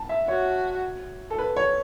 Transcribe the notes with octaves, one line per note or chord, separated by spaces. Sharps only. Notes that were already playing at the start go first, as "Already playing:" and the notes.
Already playing: A5
E5
F#4 C#5
A4
B4
C#5